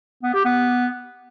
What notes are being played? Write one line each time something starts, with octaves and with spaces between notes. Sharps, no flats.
B3
G4
B3